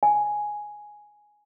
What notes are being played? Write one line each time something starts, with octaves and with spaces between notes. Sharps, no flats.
G#5